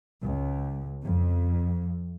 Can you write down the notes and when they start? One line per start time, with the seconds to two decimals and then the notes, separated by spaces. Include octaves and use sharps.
0.23 C#2
1.03 F2